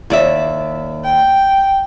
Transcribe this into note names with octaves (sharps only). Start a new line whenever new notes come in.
D#2 D5 E5
G5